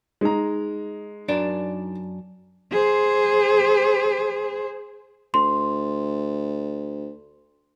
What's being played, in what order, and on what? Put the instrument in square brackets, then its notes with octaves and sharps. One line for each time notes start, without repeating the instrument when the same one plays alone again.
[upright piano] G#3 A#5 [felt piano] D#4
[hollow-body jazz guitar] F#2 D4 A#4 [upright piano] D5
[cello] G#4 C5
[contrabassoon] D2 [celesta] C6